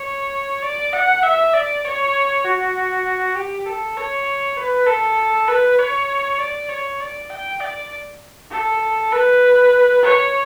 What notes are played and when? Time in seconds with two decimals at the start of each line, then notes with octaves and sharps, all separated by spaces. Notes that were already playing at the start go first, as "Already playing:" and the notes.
Already playing: C#5
0.62 D5
0.93 F#5
1.23 E5
1.53 D5
1.84 C#5
2.44 F#4
3.35 G4
3.66 A4
3.97 C#5
4.57 B4
4.86 A4
5.48 B4
5.79 C#5
6.39 D5
6.69 C#5
7.00 D5
7.29 G5
7.60 D5
8.51 A4
9.12 B4
10.03 C#5